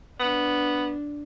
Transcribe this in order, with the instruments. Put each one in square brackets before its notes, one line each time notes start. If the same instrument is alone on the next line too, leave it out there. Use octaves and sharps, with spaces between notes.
[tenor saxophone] B3 [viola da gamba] D4